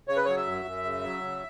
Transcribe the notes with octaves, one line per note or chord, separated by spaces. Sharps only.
C#3 C#5
B4
F#3 C#5
E5
F#2
F#2
C#3
F#3
C#3